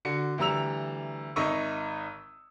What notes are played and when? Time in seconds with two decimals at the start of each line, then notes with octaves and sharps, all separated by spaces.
0.05 D3 F#4 C#7
0.38 D2 E3 G3 A#5 E6 F7
1.36 G#1 D#4 D#5 E5 C#6 E6